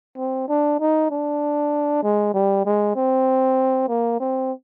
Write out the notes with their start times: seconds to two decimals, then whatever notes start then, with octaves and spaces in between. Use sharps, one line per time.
0.17 C4
0.48 D4
0.80 D#4
1.10 D4
2.03 G#3
2.34 G3
2.66 G#3
2.96 C4
3.88 A#3
4.20 C4